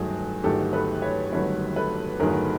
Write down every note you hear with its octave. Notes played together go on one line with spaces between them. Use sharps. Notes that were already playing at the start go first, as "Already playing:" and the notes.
Already playing: G1 G2 D#3 F#3 A3 F#4 G#4
G1 G2 D#3 F#3 A3 G4 A4
A4 B4
B4 C#5
G1 G2 D#3 F#3 A3 B4 C#5
A4 B4
G1 G2 D#3 F#3 A3 G#4 A#4